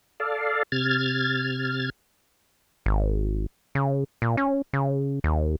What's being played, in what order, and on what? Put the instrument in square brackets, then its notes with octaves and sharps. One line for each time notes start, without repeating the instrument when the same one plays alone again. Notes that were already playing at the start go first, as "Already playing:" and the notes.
[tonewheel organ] A4 D5 F5
C3 F6 G#6 A6
[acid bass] G#1
C#3
A#2
C#4
C#3
D#2